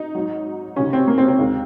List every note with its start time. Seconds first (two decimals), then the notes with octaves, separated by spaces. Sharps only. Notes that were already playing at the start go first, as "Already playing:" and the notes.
Already playing: D#4
0.15 G#2 F#3
0.76 C#2 C3 D#3 C#4
0.93 C4
1.07 A#3
1.18 C4
1.28 C4
1.39 D#2 D#3 G#3